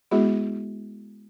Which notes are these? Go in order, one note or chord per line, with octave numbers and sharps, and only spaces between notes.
G#3 B3 E4 F#4 G#4